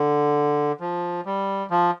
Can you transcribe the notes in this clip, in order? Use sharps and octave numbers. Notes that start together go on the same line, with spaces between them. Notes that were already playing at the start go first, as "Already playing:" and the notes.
Already playing: D3
F3
G3
F3